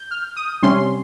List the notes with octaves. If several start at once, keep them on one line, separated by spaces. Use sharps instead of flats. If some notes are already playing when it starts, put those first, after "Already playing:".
Already playing: G6
F6
D#6
C3 G3 C#4 C6